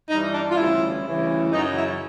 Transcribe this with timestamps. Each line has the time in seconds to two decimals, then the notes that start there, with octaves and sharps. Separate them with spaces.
0.10 G2 E3 G3 D#4
0.34 D4
0.51 F4
0.57 D2 C#3 E3 G3 E4
1.04 D2 C#3 E3 G3
1.52 F#2 C#3 F#3 D#4
1.75 E4